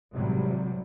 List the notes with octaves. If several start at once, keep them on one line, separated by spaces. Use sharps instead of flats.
G#1 A2 C3 F#3 G3